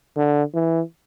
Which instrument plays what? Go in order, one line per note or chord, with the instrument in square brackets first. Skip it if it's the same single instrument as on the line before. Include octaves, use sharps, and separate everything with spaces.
[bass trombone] D3
E3